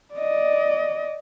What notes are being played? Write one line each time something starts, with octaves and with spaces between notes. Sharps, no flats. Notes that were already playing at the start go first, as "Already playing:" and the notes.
D5 D#5